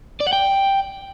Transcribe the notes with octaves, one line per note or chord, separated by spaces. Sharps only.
D5
F#5
G5